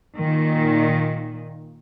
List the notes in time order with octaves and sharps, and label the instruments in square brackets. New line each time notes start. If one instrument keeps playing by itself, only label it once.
[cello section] A#2 D#3